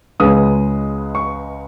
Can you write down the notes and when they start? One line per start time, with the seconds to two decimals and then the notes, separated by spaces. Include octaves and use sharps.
0.20 C#2 C#3 G#3 B3 D#6
1.15 C#6